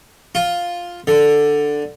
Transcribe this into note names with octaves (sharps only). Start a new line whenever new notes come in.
F4
D3